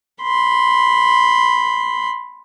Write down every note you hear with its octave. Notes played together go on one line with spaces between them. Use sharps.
B5 C6